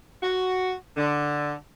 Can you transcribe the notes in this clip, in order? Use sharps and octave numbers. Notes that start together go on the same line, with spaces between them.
F#4
D3